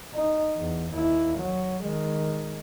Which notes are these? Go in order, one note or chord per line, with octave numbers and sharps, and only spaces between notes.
D#4
E2
D#2 E4
F#3
D#3 G#3